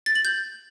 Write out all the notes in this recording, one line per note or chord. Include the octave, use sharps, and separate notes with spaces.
A6
F#7
G6